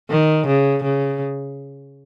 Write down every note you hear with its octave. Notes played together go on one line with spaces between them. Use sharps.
D#3
C#3
C#3